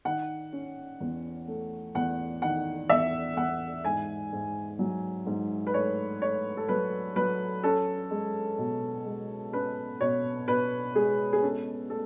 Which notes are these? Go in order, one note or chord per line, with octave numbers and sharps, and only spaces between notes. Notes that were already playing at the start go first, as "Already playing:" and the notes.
D#3 F#5
C#4
E2
A3
E2 F#5
D#3 F#5
E2 E5
E2 F#5
G#2 G#5
G#2
F#3
G#2
B4
A3 C#5
A3 C#5
A4
F#3 B4
F#3 B4
C#4 A4
G#3
B2
G#3
C#4 B4
B2 C#5
B2 B4
G#3 G#4
G#4
C#4 A4
A3 A4